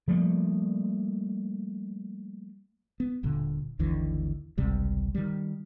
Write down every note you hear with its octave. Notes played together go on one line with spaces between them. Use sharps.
F3 G3 A3 A#3
B3
D#1 A#2 D3
G#1 D#2 D3 E3
G#1 C#2 C3 G3
D#3 G3